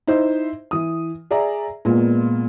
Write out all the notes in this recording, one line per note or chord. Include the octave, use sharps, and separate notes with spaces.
D#4 E4 C5 E5
E3 D#6
G#4 D5 E5 A#5
A#2 G#3 B3 F4